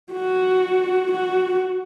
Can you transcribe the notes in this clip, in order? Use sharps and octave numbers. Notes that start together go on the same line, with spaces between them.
F#4
F#4